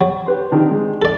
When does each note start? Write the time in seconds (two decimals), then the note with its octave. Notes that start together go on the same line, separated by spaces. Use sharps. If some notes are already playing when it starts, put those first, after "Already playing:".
0.01 F#3
0.26 G4 B4 C6
0.51 C3 D#3 D4
0.71 G#3
1.02 A4 D5